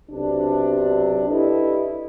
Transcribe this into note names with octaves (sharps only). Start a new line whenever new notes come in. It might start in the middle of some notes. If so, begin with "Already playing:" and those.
B1 C3 D4
D4 E4 G4 A4 B4 D#5